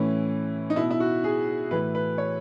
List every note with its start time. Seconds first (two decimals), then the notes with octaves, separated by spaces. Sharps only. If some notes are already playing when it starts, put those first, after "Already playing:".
Already playing: A2 E3 C#4
0.70 D#4
0.76 B2 E4
0.90 E4
1.00 F#4
1.24 G#4
1.71 A2 E3 B4
1.95 B4
2.18 C#5